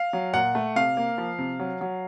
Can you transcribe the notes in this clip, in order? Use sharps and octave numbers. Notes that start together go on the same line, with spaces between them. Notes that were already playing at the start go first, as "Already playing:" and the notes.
Already playing: F5
F#3
A#2 F#5
A3
C3 F5
A#3
F3
C3
F#3
F#3